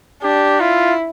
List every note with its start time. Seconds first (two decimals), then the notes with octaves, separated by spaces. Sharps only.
0.23 D4 G4
0.60 E4 F4